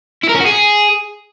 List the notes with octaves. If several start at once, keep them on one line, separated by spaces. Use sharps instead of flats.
E4
A#4
C#4
F#4
G#4